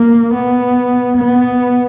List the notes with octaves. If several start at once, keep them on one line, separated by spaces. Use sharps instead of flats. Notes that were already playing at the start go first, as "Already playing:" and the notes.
Already playing: A#3
B3
B3